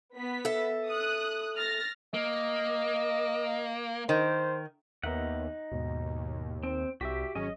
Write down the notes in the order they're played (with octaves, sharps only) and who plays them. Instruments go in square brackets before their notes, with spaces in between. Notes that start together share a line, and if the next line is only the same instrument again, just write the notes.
[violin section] B3 B6
[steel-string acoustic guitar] A4 E5
[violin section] D#6 F#6
F6 A6 A#6
[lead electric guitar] A#3 [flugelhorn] D#5
[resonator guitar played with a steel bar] D#3 [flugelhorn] C5
[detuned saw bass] D#2 [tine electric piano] B3 A#4 E5 [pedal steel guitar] D#4 F#5
[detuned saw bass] D#2 [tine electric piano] G#2 B2
[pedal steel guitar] C4
[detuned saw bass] C2 [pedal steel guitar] F#4 G4 [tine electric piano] E5 B6
[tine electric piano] G#1 F#3 G#4 [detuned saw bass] C#4 [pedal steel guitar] D#5